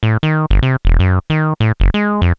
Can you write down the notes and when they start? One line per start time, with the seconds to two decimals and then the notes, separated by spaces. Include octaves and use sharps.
0.03 A2
0.23 D#3
0.51 G1
0.62 C3
0.85 E1
0.99 F#2
1.30 D#3
1.60 A2
1.80 F#1
1.94 G#3
2.22 F2